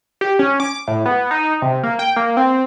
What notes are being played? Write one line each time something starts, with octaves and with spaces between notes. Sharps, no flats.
G4
C#4
D6
A2
B3
D#4
C3
A#3
G5
A#3
C4